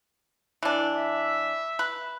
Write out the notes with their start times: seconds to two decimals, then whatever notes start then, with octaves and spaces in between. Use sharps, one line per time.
0.63 E3 D4
0.98 E5
1.79 B4